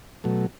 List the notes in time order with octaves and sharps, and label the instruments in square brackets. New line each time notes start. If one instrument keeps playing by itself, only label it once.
[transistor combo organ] B2 F#3 A3